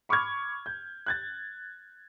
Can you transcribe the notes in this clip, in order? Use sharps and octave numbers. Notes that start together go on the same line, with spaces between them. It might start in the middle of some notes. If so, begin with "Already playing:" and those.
B5 C#6 D6 F6 G#6
G6
F#6 G#6 A6